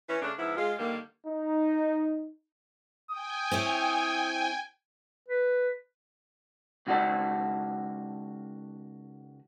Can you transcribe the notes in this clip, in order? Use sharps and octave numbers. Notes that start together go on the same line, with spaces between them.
E3 C#4
C#3 A3 C#4 D4
G#2 F3 B3 E4
G#3 F4
D3 D#3 G3 A#3
D#4
G5 G#5 D#6
C4 E4 C#5
B4
C#2 D#3 F#4 G4 D5 A5